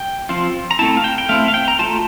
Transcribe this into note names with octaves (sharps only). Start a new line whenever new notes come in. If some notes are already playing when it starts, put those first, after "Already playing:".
Already playing: G5
F3 C4 F4
A#5
A3 C4 E4 A5
F5
G5
G5
A3 C4 E4 F5
F5
G5
A#5
A3 C4 F4 A5